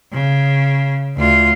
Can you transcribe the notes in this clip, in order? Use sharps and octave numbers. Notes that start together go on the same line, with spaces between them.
C#3
D2 F4